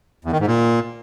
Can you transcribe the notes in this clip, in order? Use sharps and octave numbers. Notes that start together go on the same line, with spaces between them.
E2
D#3
G#2
A#2